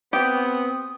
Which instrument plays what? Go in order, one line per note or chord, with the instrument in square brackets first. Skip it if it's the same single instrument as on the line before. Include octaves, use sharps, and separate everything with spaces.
[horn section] B3 [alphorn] C4 [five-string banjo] G4 [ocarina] D#6